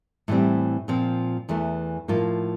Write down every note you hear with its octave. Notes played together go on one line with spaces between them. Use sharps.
A2 E3 G3 C4
A#2 F3 C4
E2 E3 A3
A2 F3 A#3 F4